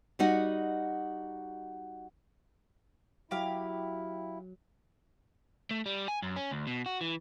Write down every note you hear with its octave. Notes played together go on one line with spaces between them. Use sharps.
G3 D#4 F#4 D#5 F#5
F#3 E4 G4 F5
A3
G3
G#5
F#2
C#4
D2
B2
F#4
E3